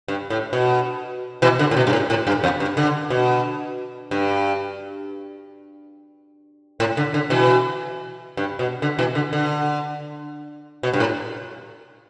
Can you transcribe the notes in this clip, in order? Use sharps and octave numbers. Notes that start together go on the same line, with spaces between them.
G2
A2
B2
B2 E3
D3
A2
B2
G2
A2
A2
G2
E2
G2
D3
B2
G2
A2
D3
D3
B2 E3
G2
B2
D3
B2 E3
D3
D3
B2
G2
A2